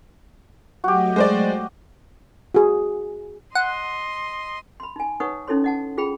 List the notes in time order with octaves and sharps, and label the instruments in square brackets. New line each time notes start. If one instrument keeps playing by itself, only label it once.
[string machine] F#3 A3 D#5 [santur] F#4 G4
[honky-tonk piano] G#3 C5 D5
[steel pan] F#4 G#4
[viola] D#5 C6 [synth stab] F#5
[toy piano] B5 C6
D#4 G#5
D#4 B4 C#5 F#5 C#6 D#6
C#4 D#4 E4 A4 C#5 C6
D#5 F#5 A5
F4 G#4 G5 B5